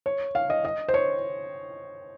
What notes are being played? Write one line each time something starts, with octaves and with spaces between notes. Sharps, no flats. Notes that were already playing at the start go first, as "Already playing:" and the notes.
C#5
F5
D#5
D#5
C5
C#5